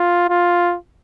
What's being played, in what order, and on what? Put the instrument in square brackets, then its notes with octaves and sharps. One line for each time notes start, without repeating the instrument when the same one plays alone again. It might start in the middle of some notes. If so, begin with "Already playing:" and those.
Already playing: [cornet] F4
F4